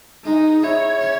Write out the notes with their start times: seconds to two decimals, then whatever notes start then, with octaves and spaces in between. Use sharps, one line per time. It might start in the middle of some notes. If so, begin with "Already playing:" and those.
0.24 G#3 D#4
0.63 E4 C#5
1.01 C#4